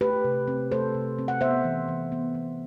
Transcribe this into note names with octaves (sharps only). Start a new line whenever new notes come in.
A3 G4 B4
C3
C4
A3 A4 C5
C3
C4
F#5
B3 C5 E5
E3
E3
B3
E3